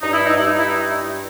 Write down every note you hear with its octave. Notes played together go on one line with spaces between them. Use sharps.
G2 D#4
E4
D#4
G2 E4
D#4
E4
D#4